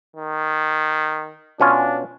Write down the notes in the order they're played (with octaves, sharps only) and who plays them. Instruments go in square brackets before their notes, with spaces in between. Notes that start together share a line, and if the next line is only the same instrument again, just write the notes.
[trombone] D#3
[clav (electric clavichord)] B2 C#4 F4 [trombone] D4